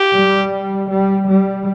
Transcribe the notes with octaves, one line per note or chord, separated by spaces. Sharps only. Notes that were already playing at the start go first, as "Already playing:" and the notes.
Already playing: G4
G3
G3
G3